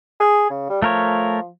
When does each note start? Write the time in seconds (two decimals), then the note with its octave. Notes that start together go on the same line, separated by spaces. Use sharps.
0.20 G#4
0.50 C#3
0.69 G3
0.82 F3 A3 A#4 C#5